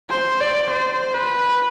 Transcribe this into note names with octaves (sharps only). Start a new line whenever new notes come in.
C5
D5
C5
B4